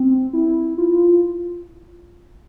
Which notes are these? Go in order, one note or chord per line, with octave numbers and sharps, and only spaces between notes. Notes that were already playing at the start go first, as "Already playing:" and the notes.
Already playing: C4
E4
F4